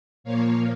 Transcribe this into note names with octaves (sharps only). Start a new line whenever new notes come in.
A#2 F3 A#3 C#5 F5